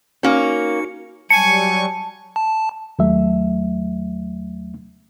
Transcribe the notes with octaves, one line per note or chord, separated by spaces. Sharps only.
A#3 C#4 D#4 F#4 C#7
F#3 G3 G#5 A5 C#6 C#7
A5
D#2 F#3 A3 E5